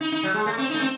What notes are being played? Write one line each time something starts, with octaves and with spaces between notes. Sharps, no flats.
D#4
D#4
F#3
G#3
A3
C4
A3 D#4
C4